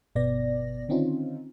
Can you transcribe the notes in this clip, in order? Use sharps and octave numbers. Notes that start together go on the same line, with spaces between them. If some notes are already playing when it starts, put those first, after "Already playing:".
G1 B2 B3 D5 A#6
D3 D#3 C4 C#4 D#4 F4